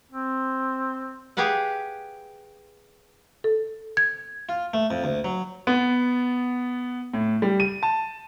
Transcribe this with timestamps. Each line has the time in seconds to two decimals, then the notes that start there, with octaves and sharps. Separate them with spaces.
0.12 C4
1.37 G4 G#4 B4 F5 F#5
3.44 A4
3.97 G#6
4.49 F4
4.74 A3
4.91 F2
5.04 D2
5.24 F#3
5.67 B3
7.14 A2
7.42 G3
7.60 D#7
7.83 A5